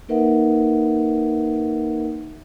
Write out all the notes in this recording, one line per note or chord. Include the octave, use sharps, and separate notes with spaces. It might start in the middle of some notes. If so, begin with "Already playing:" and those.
A#3 D#4 A#4 B4 E5 F#5